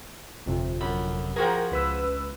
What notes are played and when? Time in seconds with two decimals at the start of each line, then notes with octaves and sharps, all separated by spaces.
0.46 G1 F2 C3
0.81 F#2 B5
1.36 F3 F#4 G#4 A#4 G5
1.71 C#2 B4 E6